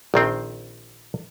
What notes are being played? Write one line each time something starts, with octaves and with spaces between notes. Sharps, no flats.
A#1 D#3 C4